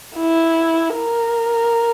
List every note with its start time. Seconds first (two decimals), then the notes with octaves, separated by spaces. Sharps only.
0.17 E4
0.96 A#4